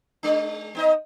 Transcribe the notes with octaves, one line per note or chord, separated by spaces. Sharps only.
G#3 D4
B3 D#4 D#5